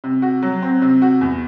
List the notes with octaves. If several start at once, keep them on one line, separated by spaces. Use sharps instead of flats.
C3
F#4
F#3
C4
C3
F#4
E2